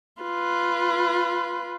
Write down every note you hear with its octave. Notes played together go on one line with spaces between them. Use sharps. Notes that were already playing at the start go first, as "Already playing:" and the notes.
F4 B4